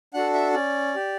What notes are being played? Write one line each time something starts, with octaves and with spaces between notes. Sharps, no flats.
D4 F#4 A4 F#5
E5
C#4 D5
G4